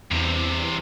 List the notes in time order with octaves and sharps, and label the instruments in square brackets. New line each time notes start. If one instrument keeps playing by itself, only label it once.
[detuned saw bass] E2 [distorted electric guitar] G2 C3